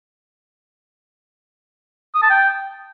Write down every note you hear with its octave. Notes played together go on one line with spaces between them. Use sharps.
D#6
A5
G5